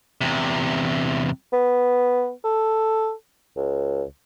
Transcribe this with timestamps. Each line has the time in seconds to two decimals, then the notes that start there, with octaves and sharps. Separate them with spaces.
0.21 E2 C3
1.53 B3
2.44 A4
3.57 C#2